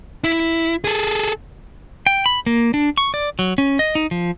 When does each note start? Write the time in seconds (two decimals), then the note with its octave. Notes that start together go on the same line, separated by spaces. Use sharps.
0.24 E4
0.84 G#4 A4
2.07 G5
2.26 B5
2.46 A#3
2.74 D4
2.98 C#6
3.14 D5
3.39 F#3
3.58 C#4
3.79 D#5
3.95 D#4
4.11 F3